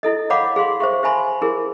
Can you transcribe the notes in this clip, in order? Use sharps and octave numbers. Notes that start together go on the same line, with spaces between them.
E4 A4 D#5
C#5 F5 F#5 B5 D6
G#4 F5 C6
C5 E5 C#6
C5 E5 G#5 B5 C6
E4 G#4 A#4